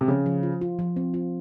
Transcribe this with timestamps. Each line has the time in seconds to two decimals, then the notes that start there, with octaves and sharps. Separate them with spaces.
0.01 C3
0.08 C#3 F3
0.26 F3
0.43 F4
0.61 F4
0.79 F3
0.96 C4
1.14 F4